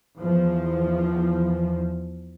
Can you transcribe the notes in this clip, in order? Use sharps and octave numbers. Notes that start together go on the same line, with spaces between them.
E2 F3